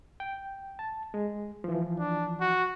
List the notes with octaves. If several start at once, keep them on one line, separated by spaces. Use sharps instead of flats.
G5
A5
G#3
E3 F3
D4
F#4